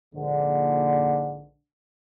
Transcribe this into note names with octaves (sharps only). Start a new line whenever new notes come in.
A#1 G#2 D3